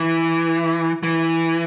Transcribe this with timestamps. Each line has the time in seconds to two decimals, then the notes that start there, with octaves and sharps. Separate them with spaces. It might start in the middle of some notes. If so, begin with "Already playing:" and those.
Already playing: E3
1.03 E3